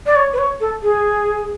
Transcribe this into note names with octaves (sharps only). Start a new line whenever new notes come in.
D5
C#5
B4
C#5
A4
G#4